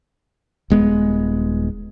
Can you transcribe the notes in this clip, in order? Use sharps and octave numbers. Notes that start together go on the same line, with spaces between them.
D#1 G#3 B3